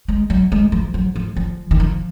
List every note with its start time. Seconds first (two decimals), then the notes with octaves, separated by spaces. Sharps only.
0.08 G#3
0.30 F#3
0.52 G#3
0.72 F3
0.94 F#3
1.16 F3
1.36 F3
1.71 D#3
1.80 F3